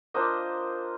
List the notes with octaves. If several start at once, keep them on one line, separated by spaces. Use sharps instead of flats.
A#3 D4 F4 C5 D#5